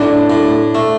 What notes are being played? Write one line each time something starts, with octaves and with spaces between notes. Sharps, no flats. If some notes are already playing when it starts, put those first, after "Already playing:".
Already playing: A2 D4
A2
A3